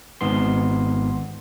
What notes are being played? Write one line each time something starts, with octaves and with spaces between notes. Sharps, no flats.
G#1 G#2 B3 C6